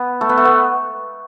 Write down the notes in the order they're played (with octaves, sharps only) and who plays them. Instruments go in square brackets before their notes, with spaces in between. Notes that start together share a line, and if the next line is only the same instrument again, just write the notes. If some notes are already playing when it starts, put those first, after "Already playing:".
Already playing: [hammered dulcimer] B3
A3
B3
A3
B3